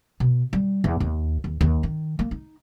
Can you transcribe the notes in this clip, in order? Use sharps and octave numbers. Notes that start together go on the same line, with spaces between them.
B2
G3
E2
D#2
D#2
D#2
D#3
A#3
D#4